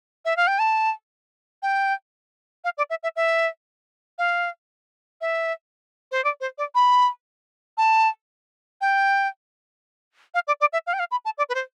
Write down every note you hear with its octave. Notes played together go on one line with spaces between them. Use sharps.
E5
F5
G5
A5
G5
F5
D5
E5
E5
E5
F5
E5
C5
D5
C5
D5
B5
A5
G5
F5
D5
D5
E5
F5
G5
F5
B5
A5
D5
B4
C5